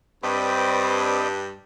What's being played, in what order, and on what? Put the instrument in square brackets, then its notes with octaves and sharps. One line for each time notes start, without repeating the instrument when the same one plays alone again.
[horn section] G2 [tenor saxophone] C4 [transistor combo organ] B4 D5 D#5